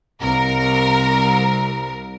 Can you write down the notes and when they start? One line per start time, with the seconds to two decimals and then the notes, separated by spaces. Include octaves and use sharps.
0.21 C2 A#4